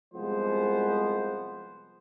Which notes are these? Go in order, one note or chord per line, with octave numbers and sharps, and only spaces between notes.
C2 F3 G#3 B3 C5